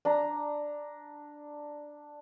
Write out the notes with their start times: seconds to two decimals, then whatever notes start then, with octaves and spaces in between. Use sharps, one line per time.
0.05 D4 A#5